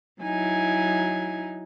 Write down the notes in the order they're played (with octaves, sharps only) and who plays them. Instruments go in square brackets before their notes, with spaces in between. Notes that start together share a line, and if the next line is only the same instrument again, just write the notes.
[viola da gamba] F#3 D#4 E4 [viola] G#5